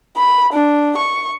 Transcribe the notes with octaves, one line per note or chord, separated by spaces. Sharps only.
B5
D4
C#6